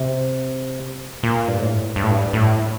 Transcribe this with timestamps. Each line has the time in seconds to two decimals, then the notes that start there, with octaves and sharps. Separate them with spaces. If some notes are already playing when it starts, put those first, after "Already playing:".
Already playing: C3
1.23 A#2
1.48 G2
1.60 A2
1.96 G2
2.03 A2
2.11 G2
2.33 A2